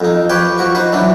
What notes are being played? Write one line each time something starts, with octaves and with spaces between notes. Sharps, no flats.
F2 D#4
F3 G4 B4 C#5 G5
F3 F#4 C#6
D#4 B4 C5
E3 F#3 D4